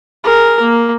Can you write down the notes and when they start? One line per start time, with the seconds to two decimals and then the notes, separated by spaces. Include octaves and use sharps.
0.24 G#4 A#4
0.60 A#3